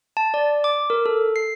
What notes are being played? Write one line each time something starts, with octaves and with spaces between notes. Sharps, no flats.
A5
D5
D6
A#4
A4
C7